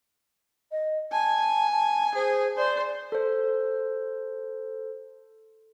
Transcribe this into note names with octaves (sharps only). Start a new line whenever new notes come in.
D#5
G#5 A5
A5
G#4 C5
C5 D5
A4 C5